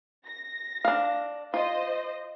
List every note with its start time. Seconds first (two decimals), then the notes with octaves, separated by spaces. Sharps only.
0.25 A#6
0.85 D4 F5
1.54 F4 C5 D#5